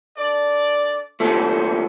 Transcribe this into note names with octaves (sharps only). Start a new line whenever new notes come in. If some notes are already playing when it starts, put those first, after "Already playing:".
D4 A4 D5
D#2 F3 A3 A4 C5